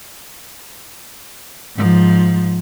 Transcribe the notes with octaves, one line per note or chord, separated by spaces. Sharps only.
G#2 F3